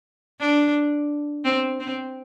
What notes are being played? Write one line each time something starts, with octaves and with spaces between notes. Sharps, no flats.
D4
C4
C4